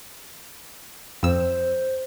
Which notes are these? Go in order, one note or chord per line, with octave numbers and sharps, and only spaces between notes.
F2 C5 E6